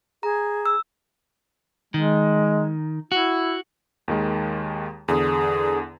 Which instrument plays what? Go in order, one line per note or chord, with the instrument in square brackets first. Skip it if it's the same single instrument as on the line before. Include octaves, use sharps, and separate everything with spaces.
[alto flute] G#4 [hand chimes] A#5
[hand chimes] E6
[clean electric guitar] D#3 [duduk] G#3
[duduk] E4 [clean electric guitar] F#4
[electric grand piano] D#2 D#3 G#3
[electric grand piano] E2 D3 [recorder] G#4